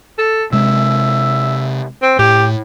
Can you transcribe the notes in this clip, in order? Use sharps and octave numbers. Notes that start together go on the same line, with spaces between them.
A4
C3 G#3 E5
C4
A2 G4